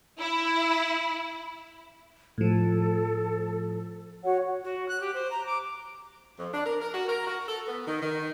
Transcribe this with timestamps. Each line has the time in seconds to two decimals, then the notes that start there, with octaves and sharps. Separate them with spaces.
0.18 E4
2.38 A2 F3 A4
4.24 F#4 C#5 F#5
4.64 F#4
4.89 F#6
5.00 G4
5.14 C5
5.31 A#5
5.46 D6
6.39 F2
6.53 D4
6.66 A#4
6.81 A#4
6.93 F#4
7.08 A#4
7.27 F#4
7.48 A4
7.67 B3
7.87 D#3
8.01 D#3